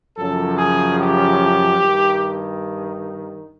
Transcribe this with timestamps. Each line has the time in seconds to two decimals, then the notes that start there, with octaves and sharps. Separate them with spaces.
0.17 F#2 C#3 F3 A4
0.58 G#4
0.98 G4
1.80 G2 D#3